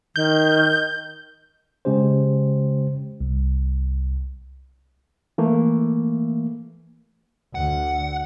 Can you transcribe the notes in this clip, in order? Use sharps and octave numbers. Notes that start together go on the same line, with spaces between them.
D#3 G6
C#3 G#3 C#4 G4 C5
C2
E3 A3 A#3
D2 F#5